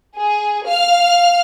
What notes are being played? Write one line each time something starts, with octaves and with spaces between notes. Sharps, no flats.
G#4
F5 F6